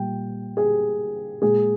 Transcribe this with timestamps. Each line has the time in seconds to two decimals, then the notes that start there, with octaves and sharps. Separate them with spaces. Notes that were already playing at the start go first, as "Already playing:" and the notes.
Already playing: A#2 G3 G5
0.57 G#4
1.41 A#2 G#3 G#4